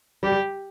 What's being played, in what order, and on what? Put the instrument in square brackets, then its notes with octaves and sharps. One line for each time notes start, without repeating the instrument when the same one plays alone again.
[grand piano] G3 [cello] G4